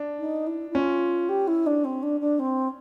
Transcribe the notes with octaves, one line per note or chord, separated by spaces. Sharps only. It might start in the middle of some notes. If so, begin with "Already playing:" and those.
Already playing: D4
D#4
E4
E4
C#4 F4
G4
E4
D4
C4
D4
D4
C4